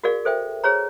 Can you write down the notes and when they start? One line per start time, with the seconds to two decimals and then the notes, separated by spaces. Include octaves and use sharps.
0.04 F#4 G#4 A#4 D5 F5
0.25 A4 C5 E5 G5
0.64 G#4 C5 C#5 A#5